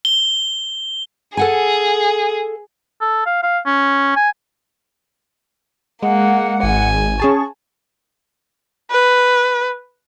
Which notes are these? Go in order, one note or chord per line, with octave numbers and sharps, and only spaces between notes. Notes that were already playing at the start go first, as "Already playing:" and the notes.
G7
G#4 A4 F#5 G#5
A4
F5
F5
C#4
G#5
G#3 A#3 F#5
G#1 G#5
C#4 G#4 A5 C#6
B4